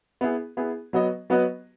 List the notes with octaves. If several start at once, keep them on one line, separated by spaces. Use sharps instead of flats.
B3 E4 G#4
B3 E4 G#4
F#3 B3 F#4 B4 D#5
F#3 B3 F#4 B4 D#5